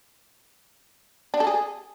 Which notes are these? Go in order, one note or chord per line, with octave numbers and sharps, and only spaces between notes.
D4
A4
G#4